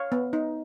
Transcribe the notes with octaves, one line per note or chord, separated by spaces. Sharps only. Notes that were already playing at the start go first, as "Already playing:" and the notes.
Already playing: C#5 F5
B3
D#4